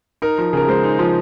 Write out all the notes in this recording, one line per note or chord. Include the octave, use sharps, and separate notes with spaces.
D#4 A#4
F3
C#3 A#4
G#3 C5
D#4
F3